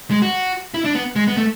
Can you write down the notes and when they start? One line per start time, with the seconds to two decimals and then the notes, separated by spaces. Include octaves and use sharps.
0.11 G#3
0.22 F#4
0.74 E4
0.85 D4
0.95 B3
1.16 G#3
1.27 B3
1.37 A3